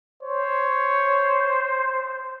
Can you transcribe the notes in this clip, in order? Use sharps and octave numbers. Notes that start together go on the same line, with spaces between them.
C5 C#5